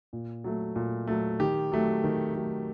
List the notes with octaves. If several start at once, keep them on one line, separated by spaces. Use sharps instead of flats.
A#2
F#3 A3
A#2
F#3 A3
D#3 G4
F#3 A3
D#3
F#3 A3